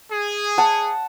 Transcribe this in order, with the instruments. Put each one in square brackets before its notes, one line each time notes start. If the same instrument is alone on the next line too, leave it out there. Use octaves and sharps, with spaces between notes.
[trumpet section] G#4
[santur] F#5 A5